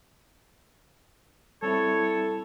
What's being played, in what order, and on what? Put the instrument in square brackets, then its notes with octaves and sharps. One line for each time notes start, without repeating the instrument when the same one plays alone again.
[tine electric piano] G3 C4 E4 [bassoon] A4 [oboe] C#5